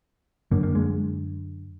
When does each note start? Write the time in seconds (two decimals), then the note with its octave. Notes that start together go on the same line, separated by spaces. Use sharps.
0.51 F#2 D3 A#3
0.63 A#3
0.75 G#3